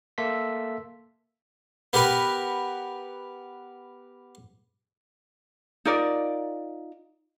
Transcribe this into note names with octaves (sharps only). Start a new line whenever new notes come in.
A#3 A4 E5 C6 B6
B3 G4 A#4 B4
D#4 F4 A#4 D5